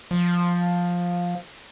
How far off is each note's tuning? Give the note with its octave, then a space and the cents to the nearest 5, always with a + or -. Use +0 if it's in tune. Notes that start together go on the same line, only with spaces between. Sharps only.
F3 +10